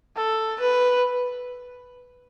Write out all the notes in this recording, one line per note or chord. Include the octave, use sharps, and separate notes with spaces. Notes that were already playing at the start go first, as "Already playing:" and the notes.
A4
B4